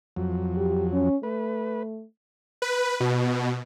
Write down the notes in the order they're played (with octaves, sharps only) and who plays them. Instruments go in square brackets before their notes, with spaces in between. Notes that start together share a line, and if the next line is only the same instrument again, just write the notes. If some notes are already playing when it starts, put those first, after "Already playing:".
[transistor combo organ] F2 F#3
[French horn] G4
C#4
[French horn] A3 [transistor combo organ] B4
[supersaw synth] B4
B2